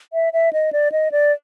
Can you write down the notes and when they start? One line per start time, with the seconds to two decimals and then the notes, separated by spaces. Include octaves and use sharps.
0.13 E5
0.33 E5
0.53 D#5
0.73 D5
0.92 D#5
1.12 D5